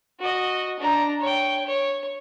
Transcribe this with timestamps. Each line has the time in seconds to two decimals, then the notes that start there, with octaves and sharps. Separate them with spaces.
0.19 F#4 D#5
0.79 D4 A#5
1.20 C#5 G5
1.65 C#5